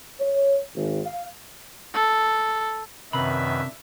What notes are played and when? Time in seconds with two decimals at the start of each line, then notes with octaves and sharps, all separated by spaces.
0.20 C#5
0.75 G#1
1.05 F5
1.94 A4
3.13 F#2 C3 D#3 D4 E4 B4 E5 B5